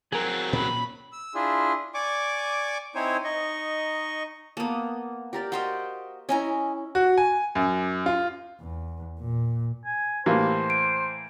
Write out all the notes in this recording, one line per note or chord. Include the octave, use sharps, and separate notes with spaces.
F#3 C4 G#4 A#4
A#2 C#4 B5
E6
D4 E4 F4 G#4
D5 G#5 C#6 D6
C4 D#4 E4 C5 C#5 G#5
D#4 D#5 C#6
A#3 B3 A4 D#6
G4 A#4 D5
F#4 C5 D#5 F5 G5
C#4 E4 D#5 G#5 A#5
F#4
G#5
F#2
F4
E2
A#2
G#5
A2 E3 A#3 G4 C5 F5 B5
D7